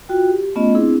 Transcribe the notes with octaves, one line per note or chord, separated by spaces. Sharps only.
F4 F#4 G5
G4
A3 B3 C#4 F4 D#5
C4 D4 E4 G#4